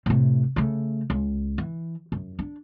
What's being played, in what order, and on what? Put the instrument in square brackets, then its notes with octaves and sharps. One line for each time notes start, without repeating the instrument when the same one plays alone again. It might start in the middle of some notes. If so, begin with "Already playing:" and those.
[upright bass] A2 C3
C#3 A3
C#2
E3
F#2
D4